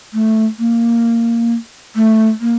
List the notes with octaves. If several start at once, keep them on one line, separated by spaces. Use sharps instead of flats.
A3
A#3
A3
A#3